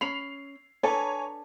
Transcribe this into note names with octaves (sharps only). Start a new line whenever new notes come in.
C#4 B5 C7 F7
D4 A4 B4 C#5 G#5 A#5